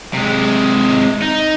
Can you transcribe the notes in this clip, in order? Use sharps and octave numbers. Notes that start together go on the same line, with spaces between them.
C3 G#3
D#4